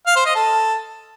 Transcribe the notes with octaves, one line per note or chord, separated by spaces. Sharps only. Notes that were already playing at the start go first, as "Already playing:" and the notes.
F5
C5
D#5
A4